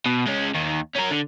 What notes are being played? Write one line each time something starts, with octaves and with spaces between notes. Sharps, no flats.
B2
G#3 C#4
D#2 D#3
C#4 A#4
D3